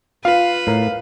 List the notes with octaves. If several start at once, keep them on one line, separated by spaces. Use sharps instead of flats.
F4 B4 F5
A2 A#4